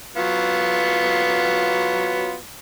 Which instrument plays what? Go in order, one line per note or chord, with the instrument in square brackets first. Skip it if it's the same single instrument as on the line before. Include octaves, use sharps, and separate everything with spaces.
[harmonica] F#3 B3 F4